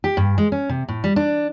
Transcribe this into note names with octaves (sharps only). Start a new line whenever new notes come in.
G4
G2
G#3
C#4
C3
A2
G3
D4